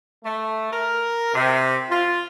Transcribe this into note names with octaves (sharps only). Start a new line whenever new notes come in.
A3
A#4
C3
F4